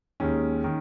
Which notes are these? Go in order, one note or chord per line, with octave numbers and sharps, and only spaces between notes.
D#2 D#3 G#3 C#4
D#3